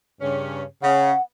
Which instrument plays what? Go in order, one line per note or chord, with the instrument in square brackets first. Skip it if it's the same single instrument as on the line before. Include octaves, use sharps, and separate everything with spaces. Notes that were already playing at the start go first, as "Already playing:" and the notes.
[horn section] G2 C#3 C#4
[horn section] C#3 [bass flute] F#5